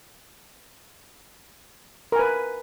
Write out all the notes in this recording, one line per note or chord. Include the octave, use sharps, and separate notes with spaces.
A#4 B4 G#5